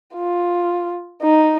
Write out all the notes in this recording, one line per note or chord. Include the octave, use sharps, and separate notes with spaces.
F4
D#4